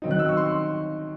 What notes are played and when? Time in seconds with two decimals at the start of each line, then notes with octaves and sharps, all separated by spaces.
0.02 D#3 F#3 C4 D#4
0.11 F#6
0.19 E6
0.29 C#6
0.37 C6